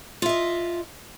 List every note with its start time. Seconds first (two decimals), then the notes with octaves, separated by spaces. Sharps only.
0.22 F4
0.26 E5
0.29 D#5